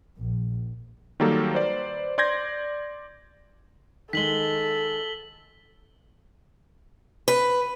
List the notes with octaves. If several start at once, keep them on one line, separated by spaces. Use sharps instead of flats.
A#1
D#3 F#3 G3 A#3 G4 A4
B4 C5 D5
D5 C6 G6 G#6 A#6
D#3 G#3 A4 B6 F#7 G7
B4